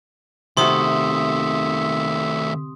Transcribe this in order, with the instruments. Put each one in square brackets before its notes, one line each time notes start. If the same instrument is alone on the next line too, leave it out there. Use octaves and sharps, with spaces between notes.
[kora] C3 F#4 [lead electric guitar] D#3 A3 [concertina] E5 [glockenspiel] C6 D#6